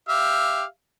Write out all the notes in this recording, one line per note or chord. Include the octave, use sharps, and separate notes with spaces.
G4 E5 F5